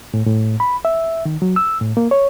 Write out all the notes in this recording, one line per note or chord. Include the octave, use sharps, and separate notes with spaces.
A2
A2
B5
E5
D#3
F#3
E6
A2
A#3
C#5